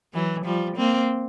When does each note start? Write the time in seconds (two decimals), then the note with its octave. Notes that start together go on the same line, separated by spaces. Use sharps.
0.14 E3 F#3
0.45 F3 G3
0.77 A#3 C4